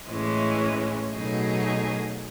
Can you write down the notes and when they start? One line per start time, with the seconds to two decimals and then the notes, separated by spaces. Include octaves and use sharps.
0.08 A2 E3 G#3 C#4
1.12 B2 F#3 A3 D#4 G#4